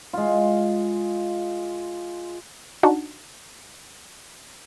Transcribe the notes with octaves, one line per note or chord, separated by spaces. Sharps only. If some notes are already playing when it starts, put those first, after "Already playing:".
G#3 F4
D4 D#4 F#4